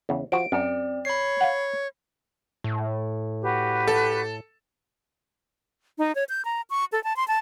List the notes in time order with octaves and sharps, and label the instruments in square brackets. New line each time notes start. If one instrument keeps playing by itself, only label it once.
[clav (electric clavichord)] E2 C#3
[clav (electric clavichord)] F3 F#4 [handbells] D7
[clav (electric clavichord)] F#2 [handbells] C4 D5
[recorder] C#5 [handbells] B5 C7
[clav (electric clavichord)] F5 F#5
[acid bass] A2
[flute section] F#4 G4 B4
[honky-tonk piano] A4
[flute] D#4
C#5
G6
A#5
C#6
A4
A5
C6
A5